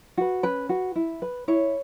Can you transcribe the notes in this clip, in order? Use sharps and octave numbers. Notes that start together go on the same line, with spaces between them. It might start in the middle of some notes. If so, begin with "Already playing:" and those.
F#4 B4
C#4 B4
F#4 B4
E4
B4
E4 C#5